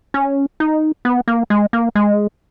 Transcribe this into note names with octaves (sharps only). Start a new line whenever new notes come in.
C#4
D#4
B3
A#3
G#3
A#3
G#3